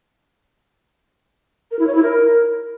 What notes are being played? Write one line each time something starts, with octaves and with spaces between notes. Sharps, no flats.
A#4
E4
C#5
E4
A#4